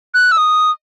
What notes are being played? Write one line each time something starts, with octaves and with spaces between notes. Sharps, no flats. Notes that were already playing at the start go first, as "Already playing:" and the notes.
F#6
E6
D#6